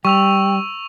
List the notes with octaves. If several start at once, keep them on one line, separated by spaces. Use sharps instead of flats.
G3 G5 C#6 E6 F7